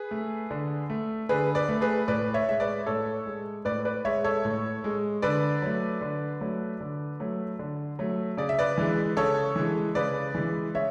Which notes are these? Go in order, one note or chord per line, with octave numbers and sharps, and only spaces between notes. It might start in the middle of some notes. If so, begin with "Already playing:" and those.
Already playing: G#4 B4
A3
D3
A3
D3 G#4 B4
B4 D5
A3
G#4 B4
A2 B4 D5
C#5 E5
G#3 E5
B4 D5
A2 A4 C#5
G#3
A2 B4 D5
B4 D5
G#3 C#5 E5
A4 C#5
A2
G#3
D3 B4 D5
F#3 A3
D3
F#3 A3
D3
F#3 A3
D3
F#3 A3
C#3 D5
E5
B4 D5
E3 G#3
C#3 A4 C#5
E3 G#3
C#3 B4 D5
E3 G#3
C#3 C#5 E5